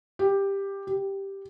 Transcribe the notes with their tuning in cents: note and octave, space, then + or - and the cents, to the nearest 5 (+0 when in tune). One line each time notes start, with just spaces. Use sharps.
G4 +10
G4 +0